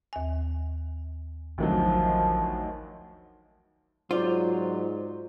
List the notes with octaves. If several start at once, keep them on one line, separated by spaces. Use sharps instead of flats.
D#2 G#5
A1 D2 D#3 F3 F#3
G#2 F#3 F4 C5 D5